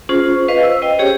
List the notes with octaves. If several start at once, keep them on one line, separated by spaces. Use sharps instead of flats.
C#4 F4 G#4 C5
B4 C5 D#5 F5
E6
C5 D#5 G5
C#4 G4 G#4 C#5